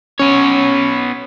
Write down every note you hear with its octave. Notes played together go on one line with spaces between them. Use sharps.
B3 C#4 C#5